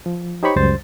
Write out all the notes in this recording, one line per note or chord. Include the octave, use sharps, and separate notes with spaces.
F3
D#4 G4 C5 C#5 B5 C#6
C#2 F#2 G3 C5 A6